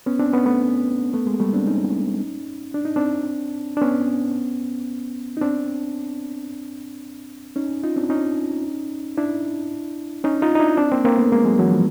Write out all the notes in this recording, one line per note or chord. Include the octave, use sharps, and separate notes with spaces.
B3 C#4
C4 D4
B3 C#4
A3 B3
A3 B3
G#3 A#3
G3 A3
C4 D4
C#4 D#4
D4
D#4
C4 D4
D4
B3 C#4
D#4
C4 D4
C#4 D#4
D#4 F4
C4 D4
C#4 D#4
D4 E4
C#4 D#4
D#4 F4
D#4
D4 E4
C4 D4
A#3 C4
A#3 C4
A3 B3
G#3 A#3
F#3 G#3
E3 F#3
F3 G3